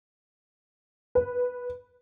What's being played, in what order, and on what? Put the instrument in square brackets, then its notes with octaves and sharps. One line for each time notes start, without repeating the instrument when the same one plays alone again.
[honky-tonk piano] B4